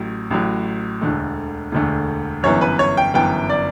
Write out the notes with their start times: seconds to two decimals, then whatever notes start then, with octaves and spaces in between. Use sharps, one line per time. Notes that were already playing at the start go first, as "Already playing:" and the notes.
Already playing: A1 A2 F#3
0.31 A1 A2 F#3
1.01 E1 D2 D3 A3
1.72 E1 D2 D3 A3
2.43 G1 F#2 E3 B3 C#5
2.61 B4
2.79 C#5
2.97 G5
3.14 G1 F#2 E3 B3 G5
3.50 D5